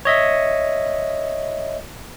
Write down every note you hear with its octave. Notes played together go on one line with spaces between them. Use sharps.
C#5 D#5 E5